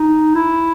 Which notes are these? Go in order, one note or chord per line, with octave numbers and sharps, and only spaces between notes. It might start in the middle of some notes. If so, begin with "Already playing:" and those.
Already playing: D#4
E4